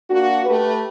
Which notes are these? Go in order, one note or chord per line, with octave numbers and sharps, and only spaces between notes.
A#3 D4 F#4
A3 G4 B4